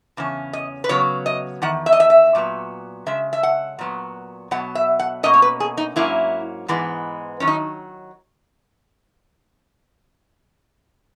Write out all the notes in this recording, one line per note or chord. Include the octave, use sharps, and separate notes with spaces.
E2 C#3 C#4
D#5
B4
C#3 F#3 B3 C#5
D#5
E2 D#3 F#5
E5
D#5
E5
E5
A#2 F#3 B3
C#3 G#3 E5
E5
F#5
A#2 F#3 B3
B2 F#3 B3 F#5
E5
F#5
B2 A#3 C#4 D#5
C#5
B4
G#4
D#4
G#2 F#3 A#3 C#4 E4
G#2 E3 G#3 B3
D#3 F#3 C#4
D#4